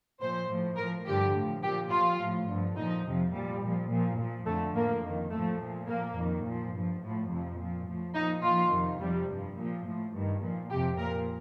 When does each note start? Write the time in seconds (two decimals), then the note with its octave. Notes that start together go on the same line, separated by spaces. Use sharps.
0.20 A#2 F3 C5
0.49 A2 F3
0.77 A2 F3 A#4
1.06 G2 D3 F3 G4
1.33 A2 F3
1.62 A#2 G4
1.67 F3
1.90 A#2 F3 F4
2.19 A2 F3
2.48 G2 D3 F3
2.76 A#2 F3 D#4
3.04 F2 C3 F3
3.33 A#2 F3 G3
3.61 A#2 F3
3.89 A#2 F3
4.18 A#2 F3
4.46 F2 D3 F3 A3
4.75 A2 F3 A#3
5.03 F2 D#3
5.31 A2 F3 A3
5.60 A#2 F3
5.88 A#2 F3 A#3
6.16 F2 D#3
6.44 A#2 F3
6.73 G2 F3
7.01 A2 F3
7.30 F2 C3 F3
7.58 A#2 F3
7.87 A2 F3
8.14 A#2 F3 D#4
8.43 A#2 F3 F4
8.72 F2 C3 D#3
9.00 F2 C3 F3 G3
9.29 G2 F3
9.56 A#2 F3 G3
9.86 A2 F3
10.13 G2 D#3
10.41 A#2 F3
10.70 F2 C3 F3 G4
10.98 A#2 F3 A#4